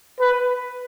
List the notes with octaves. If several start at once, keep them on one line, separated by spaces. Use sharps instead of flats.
B4